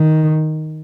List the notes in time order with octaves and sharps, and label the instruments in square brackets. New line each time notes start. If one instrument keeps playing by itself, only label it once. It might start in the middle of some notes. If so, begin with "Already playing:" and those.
Already playing: [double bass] D#3